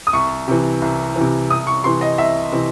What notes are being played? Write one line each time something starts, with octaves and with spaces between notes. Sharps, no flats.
D#6
C2 C#6
C3 E3
C2
C3 E3
C2 D#6
C#6
C3 E3 C6
D#5
C2 E5
C3 E3